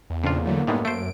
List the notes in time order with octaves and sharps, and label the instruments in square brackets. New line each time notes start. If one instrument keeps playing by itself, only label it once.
[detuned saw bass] E2
[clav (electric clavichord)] F2 F4 [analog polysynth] A#2 C#3 D4 [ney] A#3
[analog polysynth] D3 F#3 A3
[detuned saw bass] F#2 [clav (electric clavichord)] A2 G3 G#3 [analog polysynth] B3 D#4
[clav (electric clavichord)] A3 C5 [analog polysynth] D7